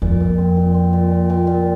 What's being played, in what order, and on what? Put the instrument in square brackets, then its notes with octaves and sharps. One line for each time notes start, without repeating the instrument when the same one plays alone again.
[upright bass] F2 [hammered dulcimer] A#2
[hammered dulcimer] A#2
C4
A#2
C4
A#2
A#2
A#2
A#2